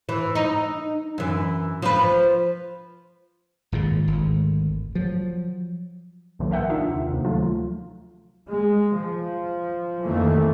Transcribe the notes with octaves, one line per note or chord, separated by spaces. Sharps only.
E3
D#4
F#2 E3
F3 B4
G#1 A#2 C#3
G#1 D2
F3 F#3
B1 A#2 D3 E3 F#3
A#4 E5 F#5 G5
D4 D#4 F4 E5
D#2 C3
D2 C3 A#3
D#3 F3 F#3 A3 F4
G#3
F3
F2 D#3 E3 A3 A#3